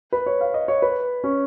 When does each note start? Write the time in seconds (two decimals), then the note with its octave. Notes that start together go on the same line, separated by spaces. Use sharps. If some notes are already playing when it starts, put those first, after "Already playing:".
0.13 B4
0.26 C#5
0.41 F5
0.54 D#5
0.68 C#5
0.82 B4
1.24 C#4